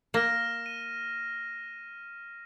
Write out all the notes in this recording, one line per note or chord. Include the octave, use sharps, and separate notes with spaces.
A#3 F6 A#6 E7
D#7